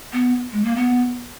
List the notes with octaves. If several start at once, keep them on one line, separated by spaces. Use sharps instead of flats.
B3
G#3
A#3
B3